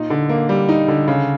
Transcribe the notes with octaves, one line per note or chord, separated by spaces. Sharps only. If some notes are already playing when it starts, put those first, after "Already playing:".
Already playing: A#2 D#4
D3
A#3
G3
D#4
D3
C#3